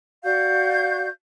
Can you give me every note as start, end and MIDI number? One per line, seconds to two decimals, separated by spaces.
0.23 1.06 66
0.23 1.06 74
0.23 1.06 77
0.23 1.06 91